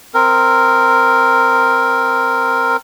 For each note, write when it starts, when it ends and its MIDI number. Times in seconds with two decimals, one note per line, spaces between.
0.14 2.77 60
0.14 2.77 70